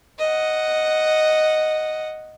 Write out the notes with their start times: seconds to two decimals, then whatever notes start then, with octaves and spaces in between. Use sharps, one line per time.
0.18 D#5 F#5